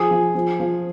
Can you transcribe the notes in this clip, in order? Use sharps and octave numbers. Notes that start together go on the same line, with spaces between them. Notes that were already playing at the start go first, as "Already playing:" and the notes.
Already playing: F3 G#4
F3
F3
F3